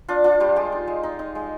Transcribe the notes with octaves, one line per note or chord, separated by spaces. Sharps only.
D4 F4
D4 F4
G3 G4
G#3 G4
D#4
G#3
D#4
D#4
G#3